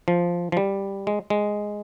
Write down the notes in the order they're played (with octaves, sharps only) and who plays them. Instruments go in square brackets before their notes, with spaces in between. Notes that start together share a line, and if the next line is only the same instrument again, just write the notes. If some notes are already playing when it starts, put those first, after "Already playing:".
[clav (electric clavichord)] F3
F3
G3
G#3
G#3